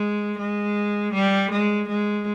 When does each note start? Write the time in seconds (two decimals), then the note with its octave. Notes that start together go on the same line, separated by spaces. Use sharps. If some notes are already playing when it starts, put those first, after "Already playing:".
Already playing: G#3
0.39 G#3
1.14 G3
1.51 G#3
1.89 G#3